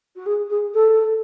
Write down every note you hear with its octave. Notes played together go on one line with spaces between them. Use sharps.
F#4
G#4
G#4
A4